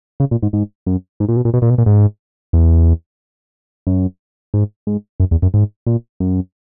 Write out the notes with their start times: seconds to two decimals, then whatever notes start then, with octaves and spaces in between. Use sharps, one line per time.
0.20 C#3
0.31 A#2
0.43 G#2
0.53 G#2
0.86 F#2
1.20 G#2
1.29 A#2
1.37 B2
1.45 A#2
1.54 B2
1.62 A#2
1.70 B2
1.78 A#2
1.86 G#2
2.53 E2
3.87 F#2
4.54 G#2
4.87 G#2
5.20 F#2
5.31 E2
5.42 F#2
5.54 G#2
5.86 A#2
6.20 F#2